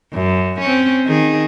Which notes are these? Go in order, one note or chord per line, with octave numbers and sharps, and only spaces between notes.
F#2
C4 C#4
D#3 G#4